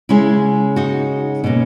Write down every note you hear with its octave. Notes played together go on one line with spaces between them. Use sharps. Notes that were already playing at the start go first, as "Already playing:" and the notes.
C#3 G#3 C#4 E4
D#4 F#4
B2 A#3 C#4